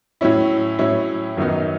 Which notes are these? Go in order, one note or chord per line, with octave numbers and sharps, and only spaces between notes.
A2 F#3 C#4 E4
A2 F#3 C#4 E4
F#2 D#3 F#3 B3 D#4